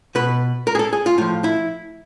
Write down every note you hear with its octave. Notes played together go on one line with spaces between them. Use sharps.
B2 B4
A#4
G#4
A4
G#4
F4
A2 F3 F4
E4